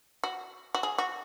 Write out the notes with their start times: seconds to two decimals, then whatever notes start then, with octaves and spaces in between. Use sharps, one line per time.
0.24 F#4
0.75 F#4
0.83 G#4
0.98 F#4